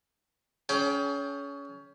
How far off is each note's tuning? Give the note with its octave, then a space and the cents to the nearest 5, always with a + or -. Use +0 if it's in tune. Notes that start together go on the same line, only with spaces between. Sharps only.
C#4 +25 G#4 +35 G5 +10